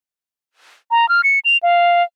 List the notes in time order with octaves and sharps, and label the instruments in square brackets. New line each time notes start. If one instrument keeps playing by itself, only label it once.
[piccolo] A#5
F6
C#7
F7
F5